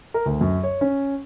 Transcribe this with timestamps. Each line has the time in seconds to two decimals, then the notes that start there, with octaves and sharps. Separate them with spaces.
0.14 A#4
0.26 D2
0.41 F#2
0.63 C#5
0.81 C#4